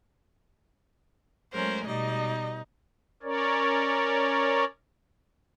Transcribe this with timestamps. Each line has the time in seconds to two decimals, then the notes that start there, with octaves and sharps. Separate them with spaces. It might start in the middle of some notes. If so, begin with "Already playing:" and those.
1.53 F#3 G#3 A3 C#4 A#4 C5
1.87 B2 G3 D#4 D#5
3.23 C#4 A#4 C#5 D5